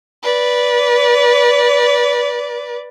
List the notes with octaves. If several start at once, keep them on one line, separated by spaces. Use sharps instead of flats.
B4 D5